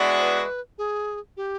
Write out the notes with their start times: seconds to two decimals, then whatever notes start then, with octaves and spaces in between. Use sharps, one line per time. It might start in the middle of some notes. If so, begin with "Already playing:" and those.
Already playing: E3 G#3 B3 D4 F#4
0.19 C5
0.23 B4
0.78 G#4
1.37 G4